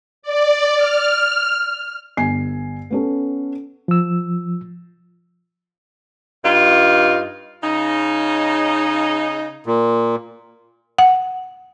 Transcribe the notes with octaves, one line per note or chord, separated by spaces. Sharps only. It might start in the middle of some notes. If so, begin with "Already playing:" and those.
D5
F6
G1 G#5 C7
B3 C#4 A4
F3 E6
G2 D#4 F4
C#3 D#4
A#2
F#5